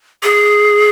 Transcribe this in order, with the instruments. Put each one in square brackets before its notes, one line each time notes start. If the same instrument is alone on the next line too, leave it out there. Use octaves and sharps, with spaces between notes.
[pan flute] G#4